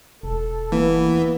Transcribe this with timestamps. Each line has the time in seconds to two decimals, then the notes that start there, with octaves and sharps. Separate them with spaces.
0.23 E1 A4
0.72 E3 A#3 B3